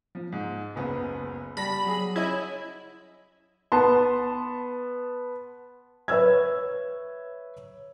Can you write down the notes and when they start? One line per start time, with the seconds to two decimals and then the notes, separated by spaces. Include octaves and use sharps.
0.15 F3
0.32 G#2
0.76 F#1 C#2 B3
1.57 G3 A5 B5 A#6
1.84 F#3 G#4
2.16 C#4 E4 C#5 D#5
3.72 B3 A5 C6
6.08 B4 C#5 E5 E6 G#6